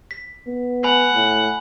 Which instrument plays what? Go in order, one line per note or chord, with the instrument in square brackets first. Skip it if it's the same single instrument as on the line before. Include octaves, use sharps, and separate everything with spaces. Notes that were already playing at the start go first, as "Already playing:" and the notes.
[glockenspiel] B6
[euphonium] B3
[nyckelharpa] F#5 [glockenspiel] G#5 B5 F#7
[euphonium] A2